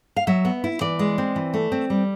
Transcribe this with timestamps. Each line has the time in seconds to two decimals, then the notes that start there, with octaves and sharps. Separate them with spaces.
0.16 F5
0.27 F#3 E5
0.45 B3
0.64 E4
0.81 E3 D5
0.99 G#3
1.18 C4
1.36 E3
1.54 A3
1.72 C4
1.90 G3